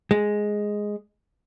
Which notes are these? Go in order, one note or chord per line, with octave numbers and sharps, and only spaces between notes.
G#3